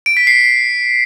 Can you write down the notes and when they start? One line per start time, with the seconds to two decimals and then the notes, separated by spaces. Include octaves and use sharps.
0.06 D7
0.17 B6
0.27 C7